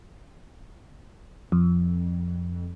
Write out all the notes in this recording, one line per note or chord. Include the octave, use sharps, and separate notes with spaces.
F2